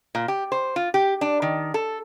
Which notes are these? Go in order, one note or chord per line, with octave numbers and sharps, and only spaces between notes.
A#2
G4
C5
F4
G4
D4
D#3
A4